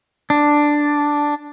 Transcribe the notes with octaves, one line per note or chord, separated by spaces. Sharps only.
D4